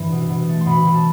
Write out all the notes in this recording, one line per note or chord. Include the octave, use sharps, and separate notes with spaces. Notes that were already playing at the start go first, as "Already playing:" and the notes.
Already playing: G2 E3
B2
B2
A3
C6
B2 B5
B2
A5